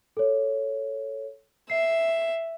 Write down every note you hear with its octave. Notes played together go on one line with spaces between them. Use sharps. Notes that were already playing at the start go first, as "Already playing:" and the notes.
A4 C#5
E5 C7